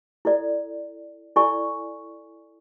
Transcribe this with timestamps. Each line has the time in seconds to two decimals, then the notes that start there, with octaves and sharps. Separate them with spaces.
0.25 E4 A4 D5
1.36 E4 A4 D5 G#5 C#6